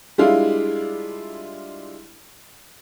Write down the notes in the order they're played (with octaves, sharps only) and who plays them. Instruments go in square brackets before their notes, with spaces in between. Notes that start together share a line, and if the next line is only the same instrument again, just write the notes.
[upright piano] G3 G#3 D4 E4 F4